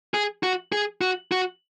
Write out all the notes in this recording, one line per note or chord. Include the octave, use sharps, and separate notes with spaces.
G#4
F#4
G#4
F#4
F#4